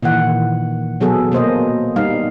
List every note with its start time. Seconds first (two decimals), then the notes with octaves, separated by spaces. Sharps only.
0.03 A#2 D#3 E3 F#5
1.00 B2 F#3 B3 G#4 A4
1.32 B2 A#3 C5 D#5
1.96 G3 B3 D#4 F5